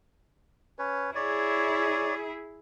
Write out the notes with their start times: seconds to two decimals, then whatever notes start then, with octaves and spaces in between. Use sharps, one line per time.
0.79 C#4 B4 C#5
1.15 E4 G#4 C#5 D5